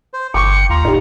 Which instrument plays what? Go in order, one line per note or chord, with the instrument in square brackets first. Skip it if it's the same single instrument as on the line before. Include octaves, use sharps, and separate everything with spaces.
[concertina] C5
[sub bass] G1 [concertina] G5 [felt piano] C#6 D6 [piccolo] C#7
[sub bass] D#2 [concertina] F4 [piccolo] A#5
[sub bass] A2 [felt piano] D#4 G4